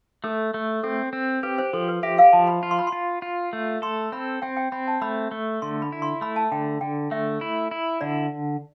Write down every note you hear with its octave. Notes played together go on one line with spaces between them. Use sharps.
A3 A4
A3
C4 A4
C4
G4 B4
C5
F3 A4
B4
G4 E5
F5
F3 A5
B5
F4
C6
B5
C6
F4
F4
A3
A4 C6
C4 B5
C4 G5
G5
C4 B5
A5
A3 B5
A3
D3 C6
B5
E4
C6
A3 B5
A5
D3 G5
D3 G5
A3 E5
E4
E4
D3 D5